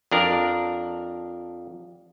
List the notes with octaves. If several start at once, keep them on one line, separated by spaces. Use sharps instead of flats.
F2 D4 A#4